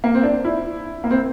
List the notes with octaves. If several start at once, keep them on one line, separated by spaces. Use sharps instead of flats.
A#3
C4
D4
E4
A#3
C4